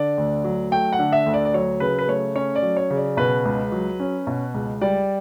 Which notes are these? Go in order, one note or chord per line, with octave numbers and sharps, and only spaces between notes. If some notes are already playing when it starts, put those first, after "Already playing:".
Already playing: D3 D5
D2
F#3
A3 G5
F#5
D3
E5
D2
D5
D5
F#3 C#5
C#3 B4
B4
A3 C#5
C#4 C#5
D5
F#3
C#5
C#3
D5
B2 B4
C#2
F#3
C#4
B2
C#2
G3 D5